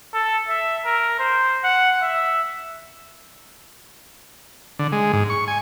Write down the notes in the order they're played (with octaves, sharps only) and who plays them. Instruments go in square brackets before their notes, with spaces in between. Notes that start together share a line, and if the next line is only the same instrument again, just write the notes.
[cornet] A4
E5
A#4
C5
F#5
E5
[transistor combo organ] D3
G#3
G#2
C#6
G#5